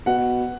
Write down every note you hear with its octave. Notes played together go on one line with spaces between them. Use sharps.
B2 F#5